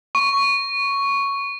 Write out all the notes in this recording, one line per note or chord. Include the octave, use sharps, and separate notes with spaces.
C#6